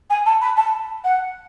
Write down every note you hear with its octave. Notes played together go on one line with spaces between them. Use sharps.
G#5
A5
B5
A5
F#5